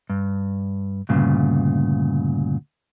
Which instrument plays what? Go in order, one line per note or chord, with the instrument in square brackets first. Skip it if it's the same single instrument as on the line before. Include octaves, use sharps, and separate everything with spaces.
[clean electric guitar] G2
D2 G2 A#2 C#3